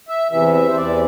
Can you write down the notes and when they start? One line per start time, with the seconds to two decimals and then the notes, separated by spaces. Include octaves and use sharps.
0.08 E5
0.31 E2 C3 E3 E5
0.54 E5
0.68 C5
0.76 E2 C3 E3 D5